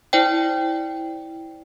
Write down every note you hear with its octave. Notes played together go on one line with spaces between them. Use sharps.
E4 C5 D5 G5